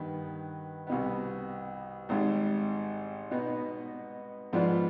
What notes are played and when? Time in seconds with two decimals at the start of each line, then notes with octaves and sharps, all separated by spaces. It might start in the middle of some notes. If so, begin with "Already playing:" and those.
Already playing: G2 D#3 B3
0.87 C2 B2 B3
2.09 G#1 G#2 G3
3.31 B2 B3 D#4
4.53 G#2 F3 B3 D4 F4